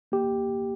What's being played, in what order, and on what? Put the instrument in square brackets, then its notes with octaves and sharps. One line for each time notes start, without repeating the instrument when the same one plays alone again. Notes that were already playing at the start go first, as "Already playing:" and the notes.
[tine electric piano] A#3 G4